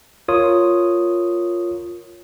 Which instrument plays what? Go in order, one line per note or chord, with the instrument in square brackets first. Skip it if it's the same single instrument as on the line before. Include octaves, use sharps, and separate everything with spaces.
[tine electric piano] F4 A#4 C#5 D#6